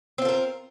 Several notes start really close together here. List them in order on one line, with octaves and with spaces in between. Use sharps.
C4 F4 A4 A#4